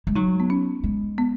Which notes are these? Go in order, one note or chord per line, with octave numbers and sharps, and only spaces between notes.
G#3
F#3 D#4
B3
C#4
G#3
B3